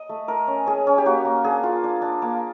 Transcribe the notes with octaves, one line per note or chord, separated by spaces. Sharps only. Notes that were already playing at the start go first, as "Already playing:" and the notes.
Already playing: D#5
A3
A3 A#4
C#4
C#4 G#4
C#4
G4
A#3 F#4
A#3
D4 G#4
F4
D4
D4
A#3